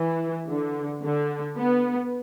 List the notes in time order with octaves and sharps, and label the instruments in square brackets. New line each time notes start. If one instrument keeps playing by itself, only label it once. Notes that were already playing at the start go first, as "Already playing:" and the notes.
Already playing: [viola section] E3
D3
D3
B3